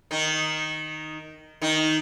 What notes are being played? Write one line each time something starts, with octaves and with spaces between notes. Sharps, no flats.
D#3 D#4
D#3 D#4